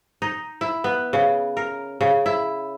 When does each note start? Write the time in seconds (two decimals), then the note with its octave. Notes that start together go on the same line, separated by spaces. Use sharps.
0.22 D#4
0.61 E4
0.84 B3
1.13 C#3
1.57 A#4
2.01 C#3
2.26 E4